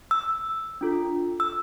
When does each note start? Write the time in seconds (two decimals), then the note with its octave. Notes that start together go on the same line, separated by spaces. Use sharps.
0.11 E6
0.81 D4 F4 A4
1.40 E6